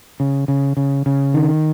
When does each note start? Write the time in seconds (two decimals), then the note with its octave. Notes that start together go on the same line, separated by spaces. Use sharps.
0.20 C#3
0.48 C#3
0.77 C#3
1.06 C#3
1.34 D#3